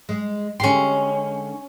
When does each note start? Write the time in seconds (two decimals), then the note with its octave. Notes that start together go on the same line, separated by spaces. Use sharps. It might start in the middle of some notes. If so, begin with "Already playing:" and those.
0.09 G#3
0.60 D3 G#3 C#4 G4 C6